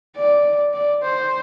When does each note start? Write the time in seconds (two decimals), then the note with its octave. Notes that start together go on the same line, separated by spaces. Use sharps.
0.17 D5
0.74 D5
1.03 C5